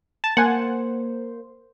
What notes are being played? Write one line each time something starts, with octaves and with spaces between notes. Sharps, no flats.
A5
A#3 C5 F#5 G#5